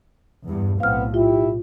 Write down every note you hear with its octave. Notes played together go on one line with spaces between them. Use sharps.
E2 G2
B1 A2 B3 C4 F5 F6
E4 F4 G4